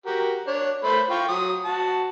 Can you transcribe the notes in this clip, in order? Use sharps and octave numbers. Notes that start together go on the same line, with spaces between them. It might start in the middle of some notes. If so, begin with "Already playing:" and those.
F#4 G4 A#4
D4 C#5
A3 C5 B5
F4 G5 C#6
F#3 D#6
F#4 A5